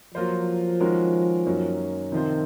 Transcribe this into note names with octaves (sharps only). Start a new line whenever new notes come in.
F3 F#3 A#3 F4 C5
D#3 G#3 C#4 F#4 A#4
F#2 D#3 F#3 A#3 C#4
C3 D#3 F3 C4 F4 C5